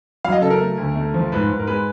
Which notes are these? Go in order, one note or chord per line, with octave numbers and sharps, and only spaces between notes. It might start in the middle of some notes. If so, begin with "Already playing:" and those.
F#3 F5
D#5
C#3 A4
A#4
A3
D2
A3
F3
G#2 B4
G#2
A#4
G#3 B4